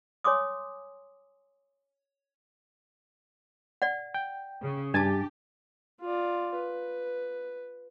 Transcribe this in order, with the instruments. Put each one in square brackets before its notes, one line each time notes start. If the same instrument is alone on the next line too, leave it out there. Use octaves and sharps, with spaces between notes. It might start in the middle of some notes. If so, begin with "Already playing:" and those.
[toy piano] C#5 G#5 C6 D6 D#6
D5 F#5
[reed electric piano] G5
[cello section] C#3
[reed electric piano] G2 G#5 A6 [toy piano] D4 A5 [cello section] G4
[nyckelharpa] F4 D5
B4